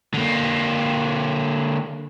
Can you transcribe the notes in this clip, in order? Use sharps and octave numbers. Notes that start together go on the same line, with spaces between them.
D3 A#3